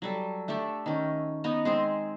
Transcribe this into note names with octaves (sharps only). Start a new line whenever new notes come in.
F#3 G3 A4
A3 D4 G4 A4
D#3 C#4
B3 D#4 D#5 A#5
G#3 C4 G#4